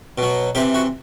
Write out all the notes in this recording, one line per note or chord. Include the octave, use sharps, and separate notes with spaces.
B2 F#3
C3 E3 G4
F#4